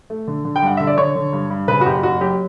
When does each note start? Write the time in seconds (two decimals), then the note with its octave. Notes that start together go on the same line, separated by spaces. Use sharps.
0.10 A3
0.28 D3
0.45 D3
0.56 G5
0.62 G2 F#5
0.77 D3 E5
0.87 D5
0.98 D3 C#5
1.15 D3
1.33 G2
1.50 G2
1.68 C#3 B4
1.81 F#4
1.86 F#1 G4
2.03 F#1 F#4
2.21 F#3 G4